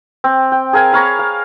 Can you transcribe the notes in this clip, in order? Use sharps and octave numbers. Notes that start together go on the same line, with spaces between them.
C4
G5
G#4 A#4 F5 G#5
A#4 C#5 F5 B5
F5